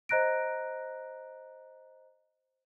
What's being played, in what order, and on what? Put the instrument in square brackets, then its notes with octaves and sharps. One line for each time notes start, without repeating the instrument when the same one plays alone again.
[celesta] C5 D#5 A#5 F#6 A#6 D7